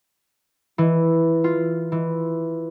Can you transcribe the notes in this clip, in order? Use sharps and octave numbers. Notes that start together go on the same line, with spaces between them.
E3
F4
E3